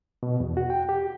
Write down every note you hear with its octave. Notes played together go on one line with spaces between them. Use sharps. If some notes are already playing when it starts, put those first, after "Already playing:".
B2
E2
F#4
G5
G4